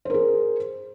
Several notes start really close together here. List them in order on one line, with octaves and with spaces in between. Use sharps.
C5 A#4 G#4